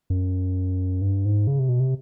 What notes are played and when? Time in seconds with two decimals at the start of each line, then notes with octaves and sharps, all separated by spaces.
0.10 F#2
1.01 G2
1.25 G#2
1.47 C#3
1.59 C3
1.69 B2
1.80 C3